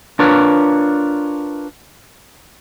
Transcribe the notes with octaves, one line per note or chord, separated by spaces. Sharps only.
D4 F4 A#4 B4 C#5